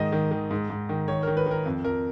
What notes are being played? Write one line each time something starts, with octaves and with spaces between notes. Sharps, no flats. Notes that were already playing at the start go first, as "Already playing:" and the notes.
Already playing: G#2 D#3 D#5
D#3
D#3
G#2
G#2
D#3
D#3 C#5
D#3 A#4
B4
D#3 A#4
F2
F2 A#4